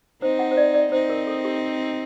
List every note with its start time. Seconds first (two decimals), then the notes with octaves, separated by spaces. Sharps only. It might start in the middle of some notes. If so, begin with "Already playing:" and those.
0.22 C4 D#4 C5
0.39 F#5
0.51 C5
0.57 D5
0.74 D5
0.92 C4 D#4 C5
1.10 A#4
1.27 A4
1.45 G4